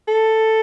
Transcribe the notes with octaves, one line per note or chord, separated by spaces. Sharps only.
A4